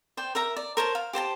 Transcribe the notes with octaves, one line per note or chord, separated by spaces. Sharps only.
C5 D5 G5
A#4 E5 A#5
D5
A#4 C5 C#5 A5
F5
G4 C5 G5 A5